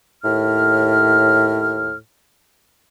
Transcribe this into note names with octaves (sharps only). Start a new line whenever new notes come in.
D#2 A2 F6